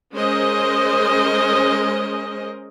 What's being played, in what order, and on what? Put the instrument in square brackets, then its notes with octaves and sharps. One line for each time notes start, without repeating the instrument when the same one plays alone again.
[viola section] G#3 C#4 A#4 C5 D#5